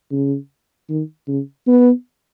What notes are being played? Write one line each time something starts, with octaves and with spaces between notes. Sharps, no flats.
C#3
D#3
C#3
B3